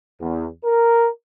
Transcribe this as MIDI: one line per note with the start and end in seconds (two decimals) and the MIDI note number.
0.20 0.47 40
0.64 1.08 70